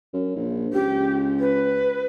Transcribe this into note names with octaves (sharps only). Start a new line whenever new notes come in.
F#2
A#1
C#2 G4
B4